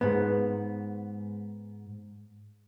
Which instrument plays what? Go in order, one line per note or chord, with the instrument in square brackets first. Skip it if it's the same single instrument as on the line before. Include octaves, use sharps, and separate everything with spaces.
[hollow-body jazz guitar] G#2 B3